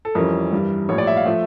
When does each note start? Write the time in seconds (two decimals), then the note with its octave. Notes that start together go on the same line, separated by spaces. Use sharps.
0.05 A4
0.15 F2 E3 G3 C#4 A#4
0.52 G2 E3 G3
0.89 A#1 A2 G3 C#5
0.98 D5
1.07 E5
1.17 F5
1.25 F3 A3 E5